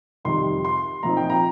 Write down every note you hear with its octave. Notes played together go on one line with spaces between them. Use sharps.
F2 C3 D#3 G3 D#4 C6
C6
A#2 F3 C4 D#4 A#5
G5
A#5